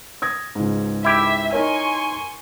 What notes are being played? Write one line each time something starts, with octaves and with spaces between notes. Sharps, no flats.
D#6 G#6 A#6
C#2 G#2
E4 G4 E5
D#4 A#4 C#5 G#5 C6 C#6